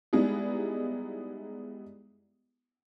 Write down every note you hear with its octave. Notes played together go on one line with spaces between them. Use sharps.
G3 G#3 B3 D#4 E4 G#4